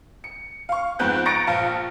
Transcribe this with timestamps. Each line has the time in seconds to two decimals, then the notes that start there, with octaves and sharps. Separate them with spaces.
0.24 C#7
0.69 F5 C#6
0.99 F2 G#2 B3 F#6 G6
1.25 A#5 C#6 A6 A#6 C#7 D7
1.47 A#1 F5 A5 F6